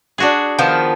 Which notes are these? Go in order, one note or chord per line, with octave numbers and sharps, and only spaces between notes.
D4 F#4 G#4
D#3 F3 B3